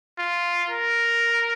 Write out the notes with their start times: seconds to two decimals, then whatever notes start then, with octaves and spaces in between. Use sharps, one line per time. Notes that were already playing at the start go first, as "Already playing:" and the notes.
0.19 F4
0.70 A#4